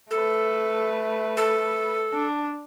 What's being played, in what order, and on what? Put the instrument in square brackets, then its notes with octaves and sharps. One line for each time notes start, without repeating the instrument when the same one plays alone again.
[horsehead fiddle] A3 B4 [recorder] A4
[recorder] A4
[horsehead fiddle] D4